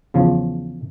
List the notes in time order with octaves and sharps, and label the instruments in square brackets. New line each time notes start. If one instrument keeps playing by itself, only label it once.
[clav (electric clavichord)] E2 C#3 F3